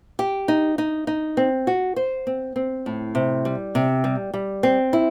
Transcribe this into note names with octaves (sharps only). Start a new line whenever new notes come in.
G4
D#4
D#4
D#4
C4
F#4
C5
C4
C4
A2
C3
G3
C3
G3
G3
C4
E4